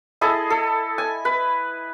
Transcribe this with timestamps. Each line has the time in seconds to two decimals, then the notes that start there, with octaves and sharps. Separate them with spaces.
0.21 E4 G#4 A4 D#5
0.50 A4
0.98 G#5
1.25 B4